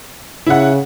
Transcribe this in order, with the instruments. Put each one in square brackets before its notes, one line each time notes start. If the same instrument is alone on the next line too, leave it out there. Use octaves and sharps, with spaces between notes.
[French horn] C#3 [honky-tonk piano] E4 F#5